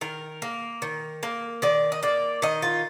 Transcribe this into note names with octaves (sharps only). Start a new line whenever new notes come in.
D#3 A#4
A#3
D#3
A#3
D#3 D5
D#5
A#3 D5
D#3 D#5
F4